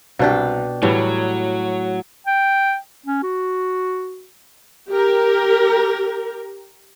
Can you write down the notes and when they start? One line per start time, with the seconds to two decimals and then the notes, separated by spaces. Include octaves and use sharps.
0.19 C2 B2 D4 G4
0.83 A2 E3 F#3 G3
2.27 G5
3.06 C#4
3.23 F#4
4.89 G4 A#4